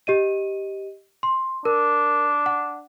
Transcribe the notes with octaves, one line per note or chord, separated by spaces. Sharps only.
G4 D#5 D#7
C6
D4 A#4
F#5